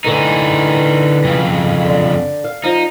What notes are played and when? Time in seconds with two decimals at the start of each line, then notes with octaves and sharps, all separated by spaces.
0.04 D3 E3 A3 B3 D#4
1.24 F2 C#3
1.85 D3
2.44 F5
2.64 F3 D#4